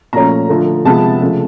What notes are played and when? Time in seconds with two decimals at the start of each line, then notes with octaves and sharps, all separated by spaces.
0.13 A#2 F3 A3 C#4 A#5
0.49 D3 F3 A3
0.85 C3 F3 G#3 B3 A5
1.21 C#3 F3 A3